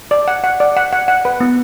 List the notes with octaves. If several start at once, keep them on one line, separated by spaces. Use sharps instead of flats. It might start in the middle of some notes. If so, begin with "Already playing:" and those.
D5
F#5
F#5
D5
F#5
F#5
F#5
B4
B3